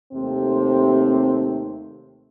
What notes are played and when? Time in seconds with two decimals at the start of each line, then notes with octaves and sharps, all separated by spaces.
0.13 D#2 C3 A3 C4 G4